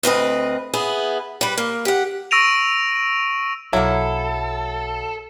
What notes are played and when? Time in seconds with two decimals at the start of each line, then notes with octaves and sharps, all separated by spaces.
0.03 D2 C4 B4 D#5
0.74 B3 E4 G#4
1.41 G3 B4
1.58 A#3
1.85 G4 F#5
2.31 C#6 E6 A#6 D7 D#7 F7
3.73 B1 F#3 A#3 C4 E4 A4